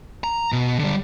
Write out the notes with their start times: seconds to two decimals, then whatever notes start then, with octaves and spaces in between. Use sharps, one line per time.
0.24 A#5
0.52 B2
0.79 D3 G3